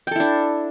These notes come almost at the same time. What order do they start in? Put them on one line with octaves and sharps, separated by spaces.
G5 A4 E4 D4